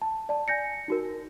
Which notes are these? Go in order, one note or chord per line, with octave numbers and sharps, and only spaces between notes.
A5
D5 A5
G#5 G6 A#6 C#7
D#4 F#4 A#4